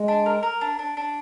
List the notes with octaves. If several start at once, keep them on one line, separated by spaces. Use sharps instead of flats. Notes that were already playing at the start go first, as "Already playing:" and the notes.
Already playing: G#3
D4
A#4
A#4
D4
D4
D4